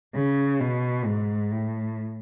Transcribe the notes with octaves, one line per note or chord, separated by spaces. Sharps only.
C#3
B2
G#2
A2